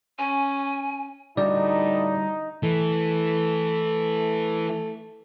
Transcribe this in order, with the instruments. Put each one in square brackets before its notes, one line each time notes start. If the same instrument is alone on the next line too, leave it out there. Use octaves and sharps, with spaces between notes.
[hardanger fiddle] C#4 [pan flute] G#5
[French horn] A2 [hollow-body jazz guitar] D3 G3 F#4 [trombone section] D#4 [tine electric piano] D5
[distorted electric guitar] E3 [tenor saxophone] A3